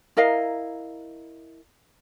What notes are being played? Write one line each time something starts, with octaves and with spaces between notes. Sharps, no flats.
E4 A#4 D#5 F5